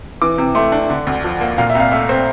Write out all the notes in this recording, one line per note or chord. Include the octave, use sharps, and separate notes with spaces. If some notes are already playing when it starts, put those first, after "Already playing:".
E3 D6
C3
A3 C6
D4
D3
D2
F3
A#3
A#2 F5
E5
C2
F5
A3 E5
C4